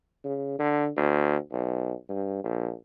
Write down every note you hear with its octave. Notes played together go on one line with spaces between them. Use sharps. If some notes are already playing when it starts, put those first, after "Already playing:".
C#3
D3
D2
B1
G2
A#1